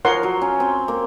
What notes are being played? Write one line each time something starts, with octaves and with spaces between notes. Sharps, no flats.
F3 A#4 C#5 F#5 C6
F#3
C#4
C4
A#3